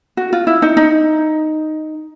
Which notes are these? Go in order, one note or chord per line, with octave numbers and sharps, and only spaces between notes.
F#4
F4
E4
D#4
D#4